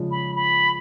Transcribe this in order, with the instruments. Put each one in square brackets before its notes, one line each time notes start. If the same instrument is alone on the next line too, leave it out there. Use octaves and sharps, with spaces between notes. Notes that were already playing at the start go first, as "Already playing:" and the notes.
Already playing: [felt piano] C#3 F3 G#3
[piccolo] B5
B5